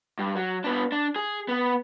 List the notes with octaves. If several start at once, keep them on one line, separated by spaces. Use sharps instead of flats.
G2
F#3
B3 D4
D4
G#4
B3